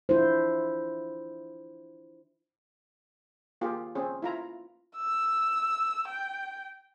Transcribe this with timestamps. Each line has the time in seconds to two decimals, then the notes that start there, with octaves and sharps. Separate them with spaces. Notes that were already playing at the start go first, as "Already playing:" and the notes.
0.09 D4 E4 F4 C5
3.61 A#3 F4 G4 G#4
3.95 C4 C#4 G#4
4.22 E4 F4 A#5
4.97 E6
6.08 G5